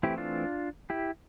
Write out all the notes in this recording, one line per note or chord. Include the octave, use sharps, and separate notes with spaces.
E3 A3 C4 E4 G4
D4 F4
E4 G4